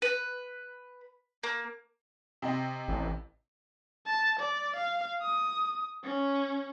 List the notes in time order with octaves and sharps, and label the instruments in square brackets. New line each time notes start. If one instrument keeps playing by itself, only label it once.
[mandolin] B4
A#3
[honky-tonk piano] C3 C4 D#5
[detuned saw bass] A1
[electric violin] A5
D5
F5
D#6
C#4